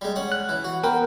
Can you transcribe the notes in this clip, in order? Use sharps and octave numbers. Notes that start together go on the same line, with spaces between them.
G3 G#3
C#4 F#5
F#6
E3
F#4
B3 A#4 G5